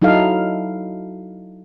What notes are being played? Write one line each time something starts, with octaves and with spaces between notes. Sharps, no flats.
F#3 D#4 E4 A4 F5